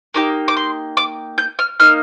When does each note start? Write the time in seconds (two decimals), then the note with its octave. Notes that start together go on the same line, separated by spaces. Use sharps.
0.14 A#3 D#4 G4 D6
0.48 D6
0.57 C6
0.97 D6
1.38 G6
1.59 F6
1.80 A#3 D#4 F6